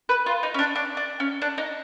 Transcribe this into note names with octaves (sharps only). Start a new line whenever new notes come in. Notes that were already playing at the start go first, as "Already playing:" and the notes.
B4
F4
D#4
C#4
D4
D4
D4
C#4
D4
D#4